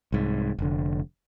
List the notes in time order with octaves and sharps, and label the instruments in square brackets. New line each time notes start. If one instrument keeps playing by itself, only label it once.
[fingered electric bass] C2 G#2
F1 D3